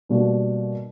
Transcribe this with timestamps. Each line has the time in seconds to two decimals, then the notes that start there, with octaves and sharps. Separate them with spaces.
0.09 B2 G3 A#3 D4 F#4